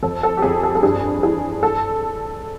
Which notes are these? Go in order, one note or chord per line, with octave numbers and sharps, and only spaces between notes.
F2 A4
A4
G4
F2 G#4
A4
A4
G2 G#4
E3 G#4
A4